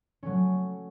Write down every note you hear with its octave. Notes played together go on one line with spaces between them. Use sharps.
F#3 A3 C#4